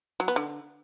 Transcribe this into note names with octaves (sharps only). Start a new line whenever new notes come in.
F#3
B3
D3